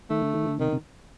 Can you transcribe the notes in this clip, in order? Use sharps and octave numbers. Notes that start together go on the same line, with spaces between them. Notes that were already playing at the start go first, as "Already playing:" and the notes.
D#3 A3
D3
D#3
D3
C3 D#3
C3